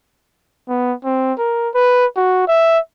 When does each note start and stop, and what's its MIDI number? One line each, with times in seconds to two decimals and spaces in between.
0.69 0.93 59
1.05 1.33 60
1.38 1.69 70
1.74 2.06 71
2.17 2.46 66
2.48 2.79 76